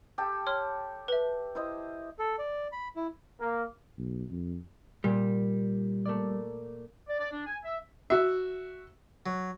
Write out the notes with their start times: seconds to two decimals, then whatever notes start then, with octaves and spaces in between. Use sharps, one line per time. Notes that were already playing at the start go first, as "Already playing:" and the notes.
0.18 G4 A4 G5
0.47 C#5 C6 F6
1.08 B4 E5
1.55 E4 C5 D#5
2.19 A4
2.39 D5
2.72 B5
2.96 E4
3.40 A#3
3.98 B1
4.30 F2
5.04 A#2 G3
6.05 A3 A#3 D5
7.08 D5
7.19 D5
7.32 D4
7.47 G#5
7.63 E5
8.10 F#4 E5
9.26 F#3